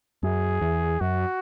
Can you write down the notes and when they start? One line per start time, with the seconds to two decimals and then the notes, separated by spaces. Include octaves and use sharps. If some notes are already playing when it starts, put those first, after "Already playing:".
0.23 F#2 G#4
0.61 E2
1.01 F#2 F#4